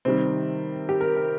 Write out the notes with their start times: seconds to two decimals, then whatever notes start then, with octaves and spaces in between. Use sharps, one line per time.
0.05 C3 D#3 G3 C4
0.89 G4
1.01 A#4
1.16 A#4